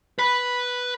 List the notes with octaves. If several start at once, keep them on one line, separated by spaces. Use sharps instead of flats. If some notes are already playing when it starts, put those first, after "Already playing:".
B4 B5